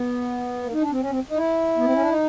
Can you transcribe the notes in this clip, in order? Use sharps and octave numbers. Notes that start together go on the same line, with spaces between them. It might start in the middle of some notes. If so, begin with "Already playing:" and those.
Already playing: B3
A#3
D#4
D4
C4
C#4
C4
D#4
E4
B3
C4
C#4
D4
D#4